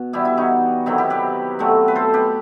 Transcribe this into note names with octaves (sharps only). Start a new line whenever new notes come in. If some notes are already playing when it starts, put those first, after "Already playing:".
Already playing: B2
E3 G3 B3 E4 G4
E4
D#4 F#4
C3 D#3 F#3 B3 E4
E4 G4
G4 B4
B2 F#3 A3 C4
B4
A4 C5
G4 B4